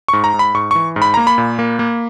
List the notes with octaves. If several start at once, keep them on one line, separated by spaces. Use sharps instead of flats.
G#2 C#6
A#5
G#2
B5
G#2 C#6
E3 C#6
G#2
B5
A#3 A#5
B5
A#2
A#3
A#3